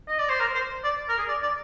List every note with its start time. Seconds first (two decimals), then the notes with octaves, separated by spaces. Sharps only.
0.08 D#5
0.19 D5
0.29 C5
0.40 A#4
0.54 C5
0.84 D5
1.08 A#4
1.18 G#4
1.28 D5
1.42 D5